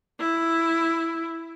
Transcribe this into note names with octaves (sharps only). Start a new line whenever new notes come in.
E4